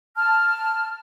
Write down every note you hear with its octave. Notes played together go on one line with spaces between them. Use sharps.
A5 F6